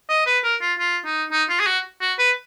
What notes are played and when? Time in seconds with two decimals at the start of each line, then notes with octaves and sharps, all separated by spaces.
0.09 D#5
0.26 B4
0.44 A#4
0.61 F4
0.79 F4
1.05 D#4
1.32 D#4
1.49 F4
1.60 G#4
1.66 F#4
2.01 F#4
2.19 B4